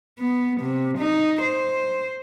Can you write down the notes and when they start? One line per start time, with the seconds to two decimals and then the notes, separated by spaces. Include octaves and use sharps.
0.19 B3
0.61 C3
0.98 D#4
1.42 C5